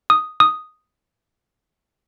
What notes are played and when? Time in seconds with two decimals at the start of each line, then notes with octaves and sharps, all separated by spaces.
0.10 D#6
0.40 D#6